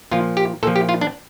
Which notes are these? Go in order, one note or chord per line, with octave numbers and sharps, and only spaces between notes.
A#2 F3 F4
G4
A#2 F3 A4
G4
F4
D4